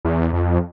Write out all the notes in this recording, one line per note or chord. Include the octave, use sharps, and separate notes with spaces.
E2
F2